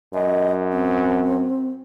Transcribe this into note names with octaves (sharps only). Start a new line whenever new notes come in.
F#2 D#5
C4